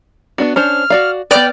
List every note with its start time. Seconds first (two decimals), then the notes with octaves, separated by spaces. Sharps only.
0.38 B3 D4 F#4
0.56 C#4 D4 C5 F6
0.90 F#4 D5 F5
1.31 B3 B4 D5 G5 F6 G6